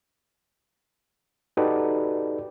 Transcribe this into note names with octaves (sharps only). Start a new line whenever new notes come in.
D#4 F#4 G4 A4 B4 D5